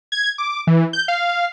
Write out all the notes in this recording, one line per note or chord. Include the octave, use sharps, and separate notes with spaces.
G#6
D6
E3
G6
F5